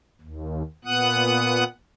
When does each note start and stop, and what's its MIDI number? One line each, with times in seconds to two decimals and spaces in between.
0.22 0.63 39
0.85 1.64 46
0.85 1.64 59
0.85 1.64 78
0.85 1.64 87
0.85 1.64 90